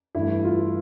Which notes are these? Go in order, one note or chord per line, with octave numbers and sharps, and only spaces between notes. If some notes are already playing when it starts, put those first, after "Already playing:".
G2 E3 A3 E4
F4